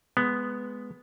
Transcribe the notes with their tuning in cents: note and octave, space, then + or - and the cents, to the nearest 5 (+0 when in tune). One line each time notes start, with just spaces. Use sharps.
G#3 +0 B3 +0